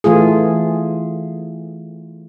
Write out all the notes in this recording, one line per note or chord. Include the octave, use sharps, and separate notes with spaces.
E3 A3 F4 G#4